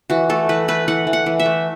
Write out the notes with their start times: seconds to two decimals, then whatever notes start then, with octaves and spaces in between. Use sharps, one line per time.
0.10 E3 F#4
0.29 A3 A4
0.49 E3 B4
0.68 A3 B4
0.88 E3 F#5
1.07 E3
1.13 F#5
1.26 E3
1.40 E5
1.46 A3